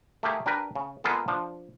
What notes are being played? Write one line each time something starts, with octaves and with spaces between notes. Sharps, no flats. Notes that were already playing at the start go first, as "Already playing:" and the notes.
A3 A#3 G4 G#4
D4 G4 A#4 B4
C#3
G#3 A#3 B3 F4 G#4 A4
F3 D4